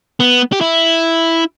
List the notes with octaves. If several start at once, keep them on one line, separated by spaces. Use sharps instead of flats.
B3
G4
E4